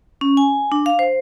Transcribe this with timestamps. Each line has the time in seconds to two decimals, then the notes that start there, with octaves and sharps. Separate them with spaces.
0.21 C#4
0.37 G#5
0.72 D4
0.86 F5
0.99 C5